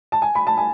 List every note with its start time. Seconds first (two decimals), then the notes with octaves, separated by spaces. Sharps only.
0.12 A5
0.22 G#5
0.35 B5
0.47 A5
0.58 G#5